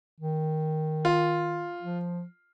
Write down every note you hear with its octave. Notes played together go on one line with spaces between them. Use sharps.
D#3
F4
F3